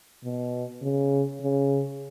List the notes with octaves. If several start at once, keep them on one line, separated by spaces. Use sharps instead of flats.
B2
C#3
C#3